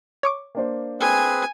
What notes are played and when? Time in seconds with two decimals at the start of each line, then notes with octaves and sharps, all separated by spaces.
0.23 C#5 C#6 D6
0.55 A#3 D4 C5
1.01 C4 G#4 B4 G#5